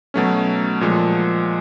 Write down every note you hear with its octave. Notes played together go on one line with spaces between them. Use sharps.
B2 F#3 A3 C#4
A#2 F3 G#3